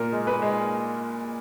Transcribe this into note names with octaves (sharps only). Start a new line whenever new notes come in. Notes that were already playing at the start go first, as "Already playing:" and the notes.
Already playing: A#2 A#4
G#3
B4
G#3